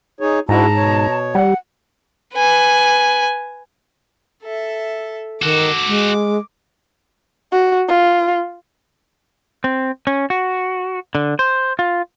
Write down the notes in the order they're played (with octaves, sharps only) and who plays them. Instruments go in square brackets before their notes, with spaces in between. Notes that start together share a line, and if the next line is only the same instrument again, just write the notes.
[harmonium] D#4 G#4 C#5
[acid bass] G#2 [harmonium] D4 E4 F#4 [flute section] A5 A#5
[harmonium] B2 C#5
[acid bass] G3 [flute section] F#5
[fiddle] B4 G#5
[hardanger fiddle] A4 E5
[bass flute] D#3 [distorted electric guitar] F#4 A4 [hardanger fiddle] D6
[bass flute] G#3
[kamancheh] F#4
F4
[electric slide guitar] C4
C#4
F#4
D3
C5
F4